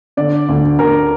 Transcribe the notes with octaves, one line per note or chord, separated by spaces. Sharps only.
D3 D5
D2
D2 A#4